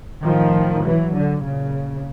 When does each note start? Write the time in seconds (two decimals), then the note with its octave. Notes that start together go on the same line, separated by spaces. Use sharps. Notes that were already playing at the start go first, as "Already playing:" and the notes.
0.23 A2 D#3 F3
0.84 E3 F#3
1.14 D3
1.44 A#2 C#3